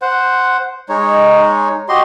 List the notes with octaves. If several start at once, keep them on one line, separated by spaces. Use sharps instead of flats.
C5 F#5
G#3 D#4 C#5
F#4 G4 D#5 C6